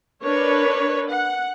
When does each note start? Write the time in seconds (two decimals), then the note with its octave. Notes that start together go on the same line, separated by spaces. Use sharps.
0.24 D4 A#4 B4 C#5
1.10 F#5